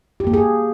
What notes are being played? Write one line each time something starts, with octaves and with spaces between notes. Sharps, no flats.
G4
A#3
G#4